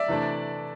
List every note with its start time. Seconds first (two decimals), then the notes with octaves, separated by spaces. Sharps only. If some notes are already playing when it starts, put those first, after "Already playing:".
Already playing: D5 E5
0.08 C3 E3 A3 D4